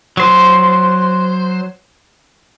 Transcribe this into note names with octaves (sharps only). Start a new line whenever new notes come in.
F#3 C5